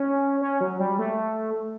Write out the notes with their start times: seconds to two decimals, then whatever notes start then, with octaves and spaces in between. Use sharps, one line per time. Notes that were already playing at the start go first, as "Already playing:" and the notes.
Already playing: C#4
0.41 C#4
0.61 F#3
0.79 G3
0.99 A3